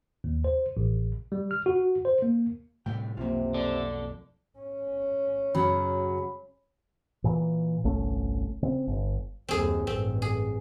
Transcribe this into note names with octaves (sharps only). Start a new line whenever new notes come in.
D#2
C5
A1
G3
F6
F#4
C5
A#3
A2 C3 G3 G5
B1 F2 C3 A#3 F4
A4 D5
C#4
F#2 C#3 F#3 B5
A#2 E3
G1 C2 A3 C#4
C#3 C4
G1
F#1 D#2 C4 G#4
A1 G2 C4
G#4